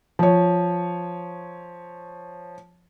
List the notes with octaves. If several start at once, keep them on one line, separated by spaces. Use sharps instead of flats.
F3 C#5